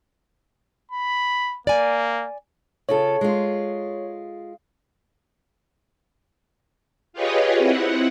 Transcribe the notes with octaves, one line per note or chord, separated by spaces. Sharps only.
B5
A#3 D5 G#5
C#3 F4 A4 C#5
G#3 F4
F4 G4 G#4 B4 C#5 D#5
C4 E4 F#5